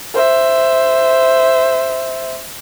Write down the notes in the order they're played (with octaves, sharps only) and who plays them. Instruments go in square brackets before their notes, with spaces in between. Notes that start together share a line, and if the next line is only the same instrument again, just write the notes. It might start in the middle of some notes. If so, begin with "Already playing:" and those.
[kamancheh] C5 E5